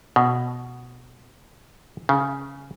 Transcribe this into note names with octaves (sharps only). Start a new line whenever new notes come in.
B2
C#3